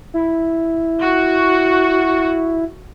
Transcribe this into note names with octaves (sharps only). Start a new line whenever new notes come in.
E4
F#4